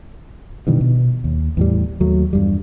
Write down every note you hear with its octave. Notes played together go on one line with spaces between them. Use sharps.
G2 B2 D#3 E3
B2
D#2
E2 A2 G3
D#2 F#3 A3
E2 G2 G3